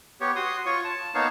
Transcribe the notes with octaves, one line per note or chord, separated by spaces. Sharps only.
B3 G4 C#5
F#4 C6 D#6
F4 C#5 C#6
A5
A#3 B3 D#4 C#5 F5 A5